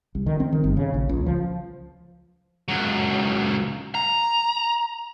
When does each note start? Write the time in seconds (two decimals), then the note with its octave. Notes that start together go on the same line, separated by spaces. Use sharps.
0.15 C2
0.26 D#3
0.40 C4
0.53 D#3
0.64 G1
0.77 C#3
0.94 A#1
1.09 C#2
1.26 F3
2.68 C#2 F#3
3.95 A#5